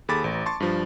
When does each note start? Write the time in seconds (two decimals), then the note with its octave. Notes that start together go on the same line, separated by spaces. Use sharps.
0.08 D#2 G#4 A4 B5 D6 A6
0.24 A1
0.46 A5 C6 C#6 A6
0.60 G2 F3